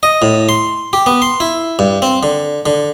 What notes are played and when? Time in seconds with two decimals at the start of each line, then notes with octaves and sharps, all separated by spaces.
0.03 D#5
0.22 A2
0.49 C6
0.93 G4
1.06 B3
1.22 C6
1.40 E4
1.79 G2
2.02 C4
2.23 D3
2.66 D3